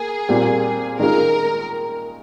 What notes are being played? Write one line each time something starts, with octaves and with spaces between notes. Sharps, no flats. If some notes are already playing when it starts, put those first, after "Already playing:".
Already playing: A#3 G#4
A#2 G3 C4 F4
D#3 G#3 C#4 F4 A#4